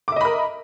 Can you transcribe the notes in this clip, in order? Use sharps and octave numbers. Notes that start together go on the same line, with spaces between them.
A#4 D#5 E5 B5 D6